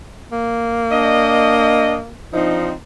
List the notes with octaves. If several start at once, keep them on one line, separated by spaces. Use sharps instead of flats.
A#3
D4 D#5
F3 C4 D4 D#4